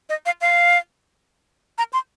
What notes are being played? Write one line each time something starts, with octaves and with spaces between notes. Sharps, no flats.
D#5
F5
F5
A#5
C6